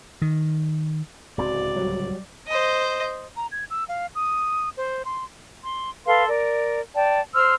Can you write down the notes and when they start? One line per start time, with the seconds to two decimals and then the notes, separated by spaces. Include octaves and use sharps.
0.22 D#3
1.38 D1 C#2 C4 F#4 D5
1.76 F#3 G3
2.47 C5 D#5
3.37 A#5
3.52 G#6
3.70 E6
3.88 F5
4.15 D#6
4.77 C5
5.05 C6
5.64 C6
6.06 A4 B4 F5 C6
6.27 A#4 D5
6.95 D5 G5 A5
7.34 C5 C6 E6 F6